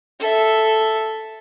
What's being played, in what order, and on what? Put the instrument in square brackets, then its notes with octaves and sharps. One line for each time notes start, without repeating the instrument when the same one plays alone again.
[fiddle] A4 E5